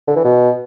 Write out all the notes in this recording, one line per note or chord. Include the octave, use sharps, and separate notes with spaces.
D3
E3
B2